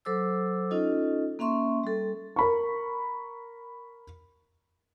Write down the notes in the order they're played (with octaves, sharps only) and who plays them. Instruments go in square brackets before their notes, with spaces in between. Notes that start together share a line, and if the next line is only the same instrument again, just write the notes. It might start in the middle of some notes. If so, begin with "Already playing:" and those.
[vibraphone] F#3 A4 C5 D6 E6
C#4 D#4 F4 A4 D#5
A#3 C#4 E5 C6 C#6
G3 A4
[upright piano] A#4 B5 C#6